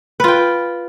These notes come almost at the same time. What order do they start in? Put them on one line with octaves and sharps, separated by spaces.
B4 F4 G5